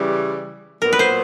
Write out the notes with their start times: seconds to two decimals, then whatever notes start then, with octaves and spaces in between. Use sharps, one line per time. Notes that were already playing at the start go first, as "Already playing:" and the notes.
Already playing: C#3 E3 G3
0.82 A#2 F#3 B3 A#4
0.93 B4
0.99 C5